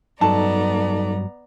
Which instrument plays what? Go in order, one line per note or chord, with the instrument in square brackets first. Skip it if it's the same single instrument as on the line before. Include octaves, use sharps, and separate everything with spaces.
[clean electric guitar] G2 F#3 [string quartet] B3 D5 A#5 [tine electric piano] D#4 A4 [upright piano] A5